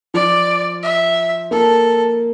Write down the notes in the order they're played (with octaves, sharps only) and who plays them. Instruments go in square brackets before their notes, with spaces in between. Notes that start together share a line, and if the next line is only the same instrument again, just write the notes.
[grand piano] F3 [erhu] D5
[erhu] E5
[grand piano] A#3 [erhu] A4